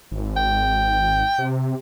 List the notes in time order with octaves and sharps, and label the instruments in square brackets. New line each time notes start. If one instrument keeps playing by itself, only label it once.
[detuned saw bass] G#1
[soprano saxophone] G5
[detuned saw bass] C3